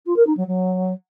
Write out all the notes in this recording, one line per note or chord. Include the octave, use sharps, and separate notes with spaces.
F4
A#4
D#4
F#3
F#3